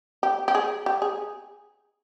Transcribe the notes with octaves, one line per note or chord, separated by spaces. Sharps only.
G4
G4
G#4
G4
G#4